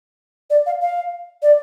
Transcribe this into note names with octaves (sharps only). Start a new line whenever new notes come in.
D5
F5
F5
D5